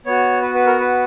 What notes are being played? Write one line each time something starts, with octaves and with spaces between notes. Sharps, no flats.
B3 F#4 C#5
B4
B4
A#4
B4